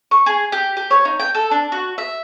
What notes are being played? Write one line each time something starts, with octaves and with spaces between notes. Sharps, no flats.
C#6
G#4
G4
G4
C#5
D#4
G5
A4
D4
F#4
E5